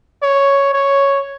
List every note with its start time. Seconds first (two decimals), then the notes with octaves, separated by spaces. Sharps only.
0.23 C#5
0.74 C#5